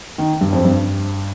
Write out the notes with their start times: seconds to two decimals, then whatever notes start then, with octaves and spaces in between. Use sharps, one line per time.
0.18 D#3
0.41 G2
0.53 F2
0.65 G2